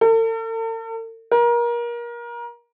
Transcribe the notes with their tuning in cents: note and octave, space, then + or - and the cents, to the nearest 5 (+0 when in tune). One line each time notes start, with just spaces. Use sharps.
A4 +45
A#4 +30